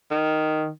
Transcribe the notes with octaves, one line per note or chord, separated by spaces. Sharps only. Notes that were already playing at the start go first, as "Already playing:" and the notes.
D#3